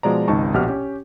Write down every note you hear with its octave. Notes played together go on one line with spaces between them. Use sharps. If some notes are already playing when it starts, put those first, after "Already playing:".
B2 F3 G#3 D5 A#5
G#1 C#2 D#4 A5 C#6
A#1 B2 G4 F#5 F6
C#4 G4